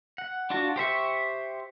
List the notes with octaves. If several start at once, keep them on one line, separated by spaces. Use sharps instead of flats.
F#5
D4 F4 F#4 A5
G4 C5 E5 C#6